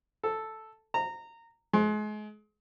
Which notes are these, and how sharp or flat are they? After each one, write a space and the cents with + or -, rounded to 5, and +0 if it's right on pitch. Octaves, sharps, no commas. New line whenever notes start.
A4 +0
A#5 -20
G#3 +35